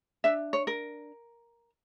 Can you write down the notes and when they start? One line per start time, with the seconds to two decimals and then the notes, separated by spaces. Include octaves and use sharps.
0.24 D4 E5
0.53 C#5
0.67 A#4